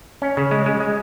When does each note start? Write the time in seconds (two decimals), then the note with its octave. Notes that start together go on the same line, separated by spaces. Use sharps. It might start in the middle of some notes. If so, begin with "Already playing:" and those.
0.22 C#4
0.37 C#3
0.51 G#3
0.66 G#3
0.80 G#3